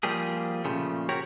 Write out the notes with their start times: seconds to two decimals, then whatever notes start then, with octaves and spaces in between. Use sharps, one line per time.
0.03 F3 G3 A#3 G4 G#4
0.64 A#2 C#3 F3 A3
1.09 F#4 G4 A#4 C#5 F#5